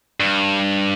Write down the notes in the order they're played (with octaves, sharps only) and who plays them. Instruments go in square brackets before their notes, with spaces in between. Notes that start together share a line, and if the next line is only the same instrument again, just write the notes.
[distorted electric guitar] G2